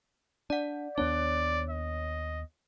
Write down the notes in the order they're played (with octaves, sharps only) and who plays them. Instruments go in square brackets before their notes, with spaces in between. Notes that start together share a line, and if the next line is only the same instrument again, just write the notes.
[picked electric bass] D4 [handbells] D5 F#5
[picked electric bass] D#2 B3 D4 [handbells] C#5 [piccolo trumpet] D5
[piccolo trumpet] D#5